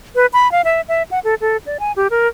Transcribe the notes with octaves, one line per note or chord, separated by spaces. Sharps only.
B4
B5
F5
E5
E5
F#5
A4
A4
D5
G#5
G4
A#4